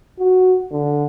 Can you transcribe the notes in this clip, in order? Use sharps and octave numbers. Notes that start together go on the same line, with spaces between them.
F#4
D3